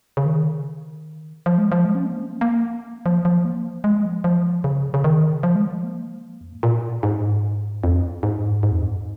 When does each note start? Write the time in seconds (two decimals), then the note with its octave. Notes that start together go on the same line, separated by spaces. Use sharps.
0.17 C#3
0.26 D#3
1.46 F3
1.58 G#3
1.72 F3
1.85 G#3
1.95 C#4
2.06 A#3
2.16 C#4
2.26 A#3
2.33 C#4
2.41 A#3
3.06 F3
3.25 F3
3.45 A#3
3.84 G#3
4.04 F3
4.24 F3
4.64 C#3
4.94 C#3
5.04 D#3
5.43 F3
5.55 G#3
5.66 F3
5.84 A#3
6.41 F2
6.53 G#2
6.63 A#2
7.03 G#2
7.84 F2
8.23 G#2
8.63 G#2
8.72 F2
8.81 G#2